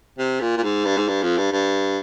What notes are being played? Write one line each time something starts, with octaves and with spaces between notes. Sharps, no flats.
C3
A#2
A#2
G#2
G2
G#2
G2
F2
G2
G2